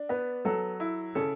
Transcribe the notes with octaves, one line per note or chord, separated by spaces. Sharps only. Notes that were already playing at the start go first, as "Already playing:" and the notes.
Already playing: D4
B3 B4
F#3 A4
E4
C#3 A4